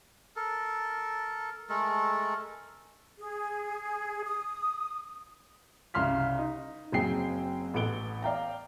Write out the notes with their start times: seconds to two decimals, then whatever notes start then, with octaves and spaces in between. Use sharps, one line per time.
0.36 A4 A#4
1.69 G#3 A3 A4 A#4
3.18 G#4
4.24 D#6
5.94 C2 C#3 C6 F6 B6
6.38 D#4
6.92 F#1 F#3 C4 G#4 G5 C7
7.74 A1 B3 A4 D7 G7
8.22 D5 F5 G5 A#5